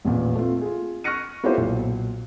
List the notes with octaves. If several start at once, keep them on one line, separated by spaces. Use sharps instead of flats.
A1 E2 A#2
A3 C4 F4
F4 G#4
C#6 F6 F#6 A#6 C#7 D#7
B3 E4 F4 G4 A4 C5
B1 A#2